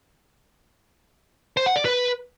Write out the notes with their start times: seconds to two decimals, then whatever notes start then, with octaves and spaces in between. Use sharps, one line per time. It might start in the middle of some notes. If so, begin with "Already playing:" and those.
1.57 C5
1.66 F#5
1.76 D5
1.85 B4